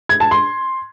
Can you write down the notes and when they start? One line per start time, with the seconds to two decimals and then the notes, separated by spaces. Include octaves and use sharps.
0.09 G#6
0.20 A5
0.31 C6